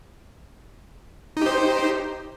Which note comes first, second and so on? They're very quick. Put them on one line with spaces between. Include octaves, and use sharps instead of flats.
D#4 G4 C5